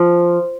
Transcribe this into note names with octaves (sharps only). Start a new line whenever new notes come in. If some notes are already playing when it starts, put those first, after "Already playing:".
Already playing: F3